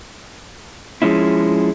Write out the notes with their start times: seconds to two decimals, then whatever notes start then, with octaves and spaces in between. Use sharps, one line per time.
1.02 F3 G#3 C#4 E4